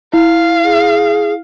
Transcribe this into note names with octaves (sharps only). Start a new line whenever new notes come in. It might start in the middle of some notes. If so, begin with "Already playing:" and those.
E4 F5
G#4